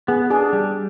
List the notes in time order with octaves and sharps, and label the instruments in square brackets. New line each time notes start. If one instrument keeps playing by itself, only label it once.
[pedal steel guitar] B3 [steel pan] G#4
[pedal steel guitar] D4 [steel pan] G#4
[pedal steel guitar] G3